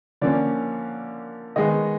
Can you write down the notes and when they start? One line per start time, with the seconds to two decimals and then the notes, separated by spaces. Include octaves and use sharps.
0.21 D3 F3 A#3 C#4 D5
1.56 D#3 G#3 B3 D#5